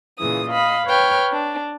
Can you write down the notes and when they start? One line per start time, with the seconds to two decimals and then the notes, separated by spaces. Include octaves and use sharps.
0.19 A#2 C#3 E3 D#6
0.50 D#5 F5 B5
0.86 B4 C#5 G5 F6
1.31 D4